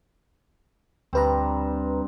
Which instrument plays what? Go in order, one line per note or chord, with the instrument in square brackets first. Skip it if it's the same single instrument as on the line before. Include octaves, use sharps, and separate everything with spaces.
[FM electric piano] D2 B4 A#5 [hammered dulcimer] G2 C4